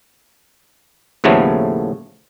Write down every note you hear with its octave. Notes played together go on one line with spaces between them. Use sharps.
D#2 A2 C#3 F3 A3 B3